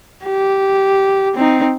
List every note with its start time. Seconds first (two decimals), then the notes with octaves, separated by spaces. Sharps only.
0.24 G4
1.35 C4 D#4